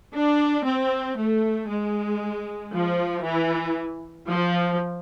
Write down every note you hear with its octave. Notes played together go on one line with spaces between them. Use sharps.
D4
C4
A3
G#3
F3
E3
F3